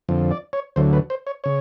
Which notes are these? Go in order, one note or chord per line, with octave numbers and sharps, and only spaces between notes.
F2 D3 F3
D5
C#5
D2 D3 F#3 C5
B4
C5
C#5
C#3 C#5